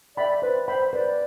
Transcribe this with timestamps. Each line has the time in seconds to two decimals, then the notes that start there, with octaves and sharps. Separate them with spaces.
0.17 D5 E5 G5 B5
0.42 B4 C5
0.68 C5 G5 B5
0.92 B4 D5